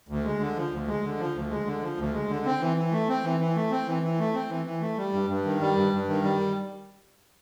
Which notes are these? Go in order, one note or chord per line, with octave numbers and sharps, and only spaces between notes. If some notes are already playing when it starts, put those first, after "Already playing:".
D2
G#3
D3
F3
D2
G#3
D3
F3
D2
G#3
D3
F3
D2
G#3
D3
C4
E3
E3
A3
C4
E3
E3
A3
C4
E3
E3
A3
C4
E3
E3
A3
G3
G2
G2
D#3
G3
G2
G2
D#3
G3